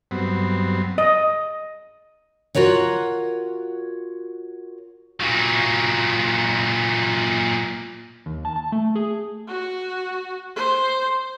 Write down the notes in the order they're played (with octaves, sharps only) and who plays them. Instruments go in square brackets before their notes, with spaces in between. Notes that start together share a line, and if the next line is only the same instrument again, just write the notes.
[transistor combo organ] G2 F#3 B3 C4
[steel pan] D#5
[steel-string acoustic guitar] F4 F#4 A#4 C#5 F#5
[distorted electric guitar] A#2 F#3
[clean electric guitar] D#2
A5
A5
A3
G#4
[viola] F#4
C5